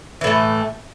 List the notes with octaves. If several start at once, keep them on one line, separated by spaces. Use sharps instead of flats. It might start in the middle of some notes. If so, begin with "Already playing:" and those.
A2 E3 A3